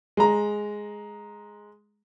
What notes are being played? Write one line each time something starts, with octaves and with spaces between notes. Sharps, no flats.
G#3 A#5